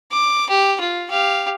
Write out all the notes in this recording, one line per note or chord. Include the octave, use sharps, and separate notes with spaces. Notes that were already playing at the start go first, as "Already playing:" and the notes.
D6
G4
F4
G4 F5